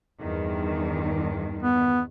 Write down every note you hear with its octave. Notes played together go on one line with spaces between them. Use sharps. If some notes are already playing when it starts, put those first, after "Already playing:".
E2 G2 D#3
B3